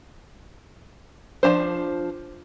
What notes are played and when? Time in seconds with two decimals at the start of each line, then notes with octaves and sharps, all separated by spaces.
1.43 F3 G#3 D4 C5